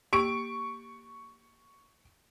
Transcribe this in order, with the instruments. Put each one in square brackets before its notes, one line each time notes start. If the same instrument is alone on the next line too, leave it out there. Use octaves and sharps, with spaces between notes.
[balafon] A#3 G4 [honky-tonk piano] C#6 D7